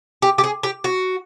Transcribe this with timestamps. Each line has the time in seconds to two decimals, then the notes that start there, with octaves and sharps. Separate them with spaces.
0.22 G4
0.38 G4
0.44 G#4
0.63 G4
0.84 F#4